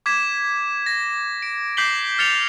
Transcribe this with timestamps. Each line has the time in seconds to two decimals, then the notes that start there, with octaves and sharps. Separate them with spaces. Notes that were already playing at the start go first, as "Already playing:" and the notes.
0.06 D6 G#6 B6 E7
0.86 A#6
1.42 D7
1.77 D6 G6 B6 C7 F#7 G7
2.19 F6 A6 C#7 F7 G7